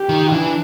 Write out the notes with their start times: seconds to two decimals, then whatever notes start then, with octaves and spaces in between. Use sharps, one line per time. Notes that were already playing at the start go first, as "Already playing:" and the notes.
Already playing: G4
0.09 D#3
0.32 E3 D4